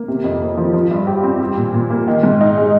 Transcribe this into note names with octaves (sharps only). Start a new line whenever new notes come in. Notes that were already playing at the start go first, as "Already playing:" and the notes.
Already playing: A#3
C3
F2
A#3
F3
F3
G2
G4
C4
G3
A#2
A#2
A#3
D#3
G#2
D#4
G#3